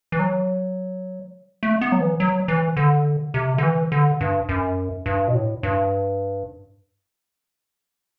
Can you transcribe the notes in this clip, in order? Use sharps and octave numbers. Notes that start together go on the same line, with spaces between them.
E3
F#3
A3
B3
F#3
E3
F#3
E3
D3
C3
D3
E3
D3
G2
F#2
G2
B2
A2
G2